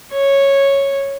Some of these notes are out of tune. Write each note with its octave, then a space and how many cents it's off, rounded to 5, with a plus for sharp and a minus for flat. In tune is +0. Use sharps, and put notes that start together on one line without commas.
C#5 -5